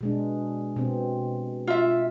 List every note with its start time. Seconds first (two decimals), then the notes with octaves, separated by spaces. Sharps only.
0.01 B2 G#3 D4
0.76 B2 C4
1.67 F4 E5